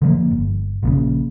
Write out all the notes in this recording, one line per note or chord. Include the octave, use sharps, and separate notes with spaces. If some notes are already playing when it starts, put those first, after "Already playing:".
D3 F3 A3 A#3
G1
A#1 A#2 C#3